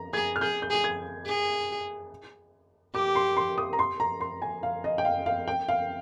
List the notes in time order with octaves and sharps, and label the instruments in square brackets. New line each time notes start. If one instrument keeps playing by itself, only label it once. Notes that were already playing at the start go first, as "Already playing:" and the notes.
Already playing: [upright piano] A#5
[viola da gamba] G#4 [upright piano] G#6
[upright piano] F6
[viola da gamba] G#4 [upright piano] G6
[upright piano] G6
[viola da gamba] G#4
[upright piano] G#6
[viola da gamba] G#4
[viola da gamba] G4 [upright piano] D6
[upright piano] C6
C6
D#6
A#5
C6
A#5
C6
G#5
F5
D#5
G5
F5
F5
G5
F5